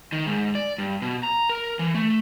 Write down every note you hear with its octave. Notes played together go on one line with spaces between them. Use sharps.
D#3
G#2
D5
G2
B2
A#5
A#4
E3
A3